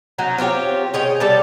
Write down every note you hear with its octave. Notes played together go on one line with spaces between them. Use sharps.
F#3 C#4 D#4
C4 F4 G4 C#5
G#4 C#5 D#5 G5
G3 A4 A5